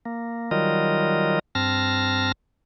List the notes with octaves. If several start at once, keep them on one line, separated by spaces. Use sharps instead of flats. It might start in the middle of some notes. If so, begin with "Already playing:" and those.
A#3
D#3 F#3 G3 F4 A#4 D#5
G2 C4 A5 F6 A#6